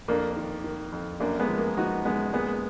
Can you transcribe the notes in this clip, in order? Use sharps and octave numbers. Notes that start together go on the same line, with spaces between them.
F2 A#3 D4
D#3
D#3
F2
F#2 A#3 D4
G#3 B3
F3
A#3
F3 D#4 F#4
F#2 G#3 B3
A#2 G#3 B3